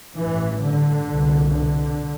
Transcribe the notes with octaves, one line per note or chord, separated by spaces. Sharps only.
A1 G2 E3
D3
C2 B2
D3